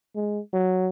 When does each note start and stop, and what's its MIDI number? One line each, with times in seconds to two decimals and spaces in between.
0.16 0.40 56
0.53 0.89 54